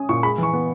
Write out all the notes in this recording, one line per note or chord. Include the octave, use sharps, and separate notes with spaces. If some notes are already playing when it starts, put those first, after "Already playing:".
Already playing: C#4 D#6
A#2 C#6
G#3 B5
E3 C#6
B3